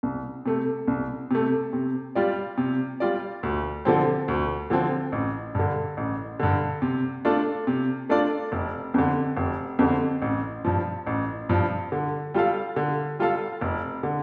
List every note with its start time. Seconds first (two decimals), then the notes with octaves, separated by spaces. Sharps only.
0.03 C2
0.46 C3 A3
0.88 C2
1.31 C3 A3
1.73 C3
2.15 G3 F4 D5
2.58 C3
3.00 G3 F4 D5
3.43 D2
3.85 D3 F3 C4
4.28 D2
4.70 D3 F3 C4
5.12 A1
5.55 G2 D3
5.97 A1
6.40 G2 D3
6.82 C3
7.25 A3 D4 F4 D5
7.67 C3
8.09 A3 D4 F4 D5
8.52 F1
8.94 F2 D3
9.37 F1
9.79 F2 D3
10.22 A1
10.65 G2 F3
11.07 A1
11.49 G2 F3
11.92 D3
12.34 G3 F4 A4 F5
12.76 D3
13.19 G3 F4 A4 F5
13.61 F1
14.03 D3